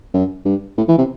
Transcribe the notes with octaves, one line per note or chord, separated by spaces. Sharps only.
F#2
G2
A2
E3
C3